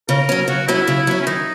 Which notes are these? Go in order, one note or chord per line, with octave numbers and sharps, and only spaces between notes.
C#3 A#4
F#3 C#4
C#3 F#4
F#3 C#4 E4
C#3
F#3 C#4
C#4
D#3 D#4